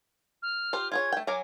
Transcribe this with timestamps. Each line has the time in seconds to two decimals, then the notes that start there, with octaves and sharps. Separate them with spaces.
0.42 F6
0.73 F4 G4 C5
0.92 F4 G#4 C#5 G#6
1.12 A3 G5
1.27 F#3 A#4 G#5 D6